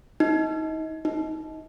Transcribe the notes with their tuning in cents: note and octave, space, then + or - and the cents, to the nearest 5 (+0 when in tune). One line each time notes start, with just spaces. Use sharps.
D#4 +30
D#4 +25